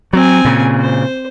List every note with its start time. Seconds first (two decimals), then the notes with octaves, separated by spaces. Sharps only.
0.13 F#3 C4 G#5
0.45 A#2 C#3
0.80 C5